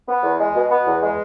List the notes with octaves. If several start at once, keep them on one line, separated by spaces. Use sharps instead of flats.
B3
E2
G#3
B2
B3
E2
G#3